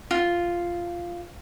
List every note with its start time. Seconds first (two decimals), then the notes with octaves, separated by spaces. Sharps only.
0.11 F4